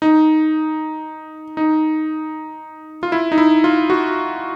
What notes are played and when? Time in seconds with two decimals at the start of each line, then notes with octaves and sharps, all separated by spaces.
0.02 D#4
1.57 D#4
3.03 F4
3.12 E4
3.32 D#4
3.38 E4
3.64 F4
3.90 F#4